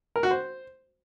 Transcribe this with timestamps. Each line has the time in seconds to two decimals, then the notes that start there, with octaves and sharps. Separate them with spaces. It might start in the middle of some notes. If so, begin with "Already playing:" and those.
0.16 A#4
0.23 F#4
0.31 C5